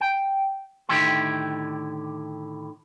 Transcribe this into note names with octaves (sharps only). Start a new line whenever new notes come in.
G5
A2 D3 D#3 E4 G4 C6